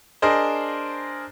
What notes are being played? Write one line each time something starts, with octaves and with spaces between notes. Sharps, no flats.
D4 G#4 A#4 C5 D#5